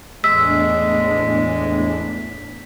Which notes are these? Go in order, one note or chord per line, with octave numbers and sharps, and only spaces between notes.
E2 A2 G#3 D4 E6 B6